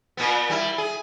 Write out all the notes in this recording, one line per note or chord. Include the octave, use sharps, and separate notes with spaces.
A#2 B3
G3 E4
G#4